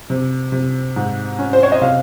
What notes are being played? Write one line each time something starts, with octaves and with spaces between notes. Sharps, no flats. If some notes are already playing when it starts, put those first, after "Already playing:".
C3
C3
G#2
C#4
C5
C#5
D#5
C3 F5